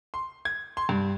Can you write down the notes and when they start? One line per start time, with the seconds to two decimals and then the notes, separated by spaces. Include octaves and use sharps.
0.14 C6
0.45 G#6
0.77 C6
0.89 G2